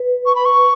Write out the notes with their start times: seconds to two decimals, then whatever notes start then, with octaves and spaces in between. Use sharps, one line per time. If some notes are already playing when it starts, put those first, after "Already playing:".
Already playing: B4
0.26 C#6
0.35 B5
0.45 C#6